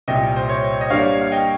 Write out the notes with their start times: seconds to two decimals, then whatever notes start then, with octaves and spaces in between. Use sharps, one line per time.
0.08 C2 A#2 G3 D#5 G5
0.36 C5
0.49 C#5
0.81 D#5
0.90 G2 G3 A#3 C#5 F5
1.21 F5
1.32 D#5 G5